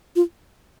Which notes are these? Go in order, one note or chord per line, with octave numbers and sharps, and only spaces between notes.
F4